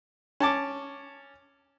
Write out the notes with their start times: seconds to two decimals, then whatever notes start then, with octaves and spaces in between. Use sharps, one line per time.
0.40 C#4 A5 D6